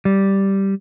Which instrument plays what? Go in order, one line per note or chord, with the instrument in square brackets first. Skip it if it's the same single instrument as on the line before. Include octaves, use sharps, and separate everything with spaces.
[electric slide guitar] G3